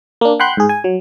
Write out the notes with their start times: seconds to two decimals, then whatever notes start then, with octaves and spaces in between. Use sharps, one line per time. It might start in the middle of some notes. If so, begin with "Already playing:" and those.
0.21 A#3 D4
0.40 F#5 G5 B5 C6 F#6 G6
0.57 G#2 G#4
0.69 G#5
0.84 F#3